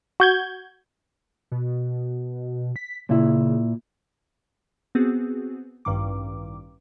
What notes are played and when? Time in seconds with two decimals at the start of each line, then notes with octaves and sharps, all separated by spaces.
0.20 F#4 G6 G#6
1.51 B2
2.76 B6
3.09 A#2 C#3 E4
4.95 B3 C4 F#4 G#4
5.85 A1 G2 D#3 D6